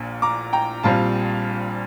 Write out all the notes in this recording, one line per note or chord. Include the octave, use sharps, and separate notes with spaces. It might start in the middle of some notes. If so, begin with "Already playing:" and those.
Already playing: A#1 A#2
A#5 D6
G5 A#5
A#1 A#2 G3 C4 F5 A5